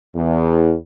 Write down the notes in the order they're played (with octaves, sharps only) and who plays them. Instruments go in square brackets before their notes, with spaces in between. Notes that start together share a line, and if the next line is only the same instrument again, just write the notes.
[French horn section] E2